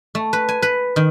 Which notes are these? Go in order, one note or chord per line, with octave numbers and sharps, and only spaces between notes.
A3
B4
G#5
B4
D#3